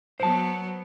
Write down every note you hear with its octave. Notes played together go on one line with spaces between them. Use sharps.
F#3 B3 C5 A5